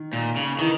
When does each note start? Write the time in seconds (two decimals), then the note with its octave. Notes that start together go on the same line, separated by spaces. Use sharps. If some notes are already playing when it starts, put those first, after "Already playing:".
Already playing: D#3
0.13 A#2
0.36 C#3
0.59 D#3 E3